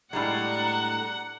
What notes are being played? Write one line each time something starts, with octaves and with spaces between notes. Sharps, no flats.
A2 G3 G#3 D4 F#5 A#5